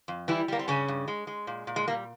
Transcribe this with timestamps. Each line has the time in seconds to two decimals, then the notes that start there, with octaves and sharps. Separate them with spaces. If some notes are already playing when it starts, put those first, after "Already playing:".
0.08 F2
0.28 E3 G3 E4
0.48 G3 A#3
0.59 C4
0.68 G2 C#3 C#4
0.88 G2
1.08 G#3
1.27 G#3
1.47 A#2
1.67 A#2
1.76 G#3
1.88 G3 A#3